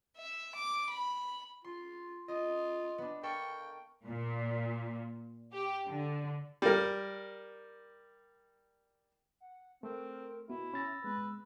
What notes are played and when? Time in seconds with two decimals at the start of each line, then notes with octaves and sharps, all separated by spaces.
0.17 E5
0.55 D6
0.90 B5
1.64 F4 C6
2.28 F4 D#5
2.98 B3 D4
3.23 A4 A#4 G5 C#6
4.07 A#2
5.53 G4
5.88 D3
6.62 G3 A#4
9.40 F#5
9.83 A3 C4 A#4
10.50 B3 E4 F#4
10.74 C#4 B5 E6 A6 A#6
11.04 G#3 B3 B4